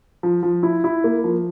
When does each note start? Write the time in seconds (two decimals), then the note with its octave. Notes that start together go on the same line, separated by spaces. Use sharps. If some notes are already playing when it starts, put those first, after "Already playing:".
0.23 F3
0.43 F3
0.63 E4
0.84 E4
1.04 A#3
1.24 F3